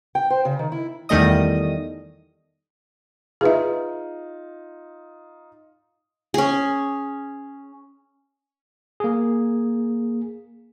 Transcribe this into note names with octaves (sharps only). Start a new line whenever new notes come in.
G5
C5
C#3
D#3
E4
E2 D#3 G3 A3 D#5 D#6
D#4 F4 G#4 B4 E5
C#4 G#4
A#3 G#4